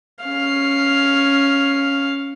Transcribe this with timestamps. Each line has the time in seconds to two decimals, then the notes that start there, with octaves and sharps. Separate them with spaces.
0.24 C#4 F5